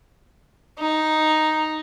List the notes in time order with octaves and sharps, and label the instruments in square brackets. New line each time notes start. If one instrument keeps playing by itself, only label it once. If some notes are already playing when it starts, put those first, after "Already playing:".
[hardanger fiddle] D#4